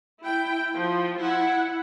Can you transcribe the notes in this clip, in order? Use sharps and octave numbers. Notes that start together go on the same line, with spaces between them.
E4 G5
F3
E4 F#5